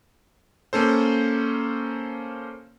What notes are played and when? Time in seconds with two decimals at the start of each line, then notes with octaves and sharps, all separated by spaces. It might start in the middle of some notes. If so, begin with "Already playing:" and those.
0.73 A#3 C#4 A4 C5